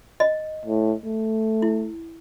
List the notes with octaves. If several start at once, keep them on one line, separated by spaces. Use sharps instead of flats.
D#5
A2
A3
E4